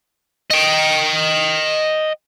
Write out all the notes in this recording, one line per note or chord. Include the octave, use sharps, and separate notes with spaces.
D#5 G5